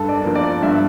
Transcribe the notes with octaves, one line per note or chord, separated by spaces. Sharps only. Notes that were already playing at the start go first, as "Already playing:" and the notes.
Already playing: G2 A4
D5
F3 A#3 D4
D5
G2 E5